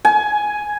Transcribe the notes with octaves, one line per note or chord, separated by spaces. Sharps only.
G#5